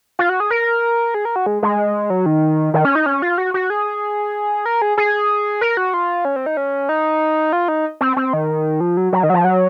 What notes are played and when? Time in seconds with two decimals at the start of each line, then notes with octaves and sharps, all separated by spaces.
0.19 F4
0.29 F#4
0.40 G#4
0.51 A#4
1.14 G#4
1.25 A#4
1.36 F#4
1.46 G#3
1.63 G#3
2.10 F#3
2.26 D#3
2.74 D#3
2.85 C#4
2.95 D#4
3.06 C#4
3.22 F4
3.38 F#4
3.54 F#4
3.70 G#4
4.66 A#4
4.82 G#4
4.97 G#4
5.61 A#4
5.77 F#4
5.94 F4
6.25 C#4
6.36 C4
6.46 D#4
6.57 C#4
6.89 D#4
7.53 F4
7.68 D#4
8.01 C4
8.16 C4
8.33 D#3
8.80 F3
8.97 F#3
9.13 F#3
9.23 D#3
9.30 F#3
9.34 F3
9.44 F#3